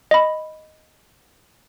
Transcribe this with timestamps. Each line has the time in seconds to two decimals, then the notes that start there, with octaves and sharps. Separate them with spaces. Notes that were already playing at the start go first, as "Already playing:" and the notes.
0.11 D#5 B5